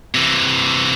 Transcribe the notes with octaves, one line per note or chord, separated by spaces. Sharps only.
C3 E3